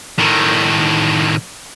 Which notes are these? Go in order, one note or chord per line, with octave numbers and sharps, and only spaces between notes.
A2 D#3